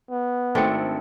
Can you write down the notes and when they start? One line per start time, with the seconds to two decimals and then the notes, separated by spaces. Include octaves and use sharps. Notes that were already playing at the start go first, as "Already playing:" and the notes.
0.11 B3
0.55 G#1 A3 C4 D4 G5 C#7